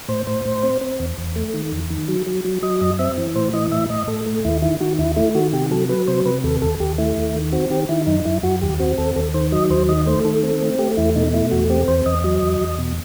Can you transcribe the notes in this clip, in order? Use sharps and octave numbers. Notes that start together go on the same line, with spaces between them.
A2 C5
A2 C5
A2
C4
C4
E2
E2
A3
D#3
E2
D#3
F#3
F#3
F#3
F#3 D#5
F#2 D#5
C4 E5
E3
A2 C5
E3 D#5
A2 E5
A2 D#5
A2 A4
A3
D#2 E4
D#3 E4
D#3 F#4
D#2 E4
A3 E4
D#3 F#4
C3 G4
F#3 A4
F#3 B4
C3 C5
C3 B4
D#2 A4
D#2 A4
D#2 G4
A3 E4
D#2
D#3
C4 F#4
D#3 G4
D#3 E4
F#2 D#4
F#2 E4
F#2 F#4
D#2 G4
C4 F#4
D#2 A4
D#2 A4
D#3 C5
F#3 D#5
D#2 C5
D#3 D#5
A3 C5
D#3 A4
C4
A3
A3 G4
E2 E4
B2 D#4
A3 E4
E2 F#4
C4 G4
E2 C5
E2 D#5
F#3 D#5
E2
E2
B2